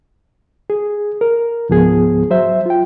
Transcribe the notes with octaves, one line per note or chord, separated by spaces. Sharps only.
G#4
A#4
C#2 G#2 F3 B3 G#4
F#3 C5 E5
F4 G5